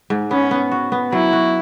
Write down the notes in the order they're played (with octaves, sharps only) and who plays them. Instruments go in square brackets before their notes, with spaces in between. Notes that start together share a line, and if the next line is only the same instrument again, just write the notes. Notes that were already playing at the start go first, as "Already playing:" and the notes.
[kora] G#2
[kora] B3 [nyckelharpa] C#4
[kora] B3
F#4
B3
[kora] F#3 [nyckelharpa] E4
[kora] F#4